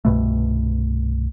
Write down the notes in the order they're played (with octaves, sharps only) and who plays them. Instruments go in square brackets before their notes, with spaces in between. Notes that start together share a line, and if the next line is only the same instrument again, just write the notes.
[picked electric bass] C2 G2 B2 A3